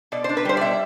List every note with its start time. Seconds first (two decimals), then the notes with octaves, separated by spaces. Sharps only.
0.12 B2 D5
0.24 D4 C5
0.37 B4
0.45 G3 C5
0.57 D5
0.61 B2 E5